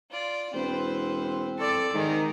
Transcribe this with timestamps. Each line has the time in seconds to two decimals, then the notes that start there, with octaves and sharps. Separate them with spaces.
0.10 F4 D5
0.54 E1 C4 B4 C5
1.59 A4 D5
1.94 G#2 D#3 D#4 A#4